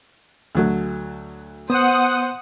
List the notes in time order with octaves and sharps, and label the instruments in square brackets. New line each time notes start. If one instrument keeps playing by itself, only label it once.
[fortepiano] D2 F#3 A3
[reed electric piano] B3 [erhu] C5 [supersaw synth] F#5 D#6